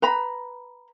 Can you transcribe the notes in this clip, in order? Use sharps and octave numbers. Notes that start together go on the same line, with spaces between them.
B4 A#5 B5